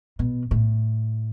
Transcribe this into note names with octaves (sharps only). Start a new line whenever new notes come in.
B2
A2